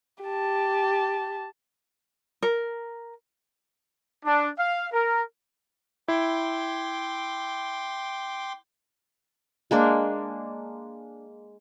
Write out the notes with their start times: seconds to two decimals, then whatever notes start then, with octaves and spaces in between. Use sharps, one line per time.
0.24 G4 A5
2.42 A#4
4.25 D4
4.57 F5
4.92 A#4
6.08 E4 G5 C6 D6
9.71 G#3 A#3 D4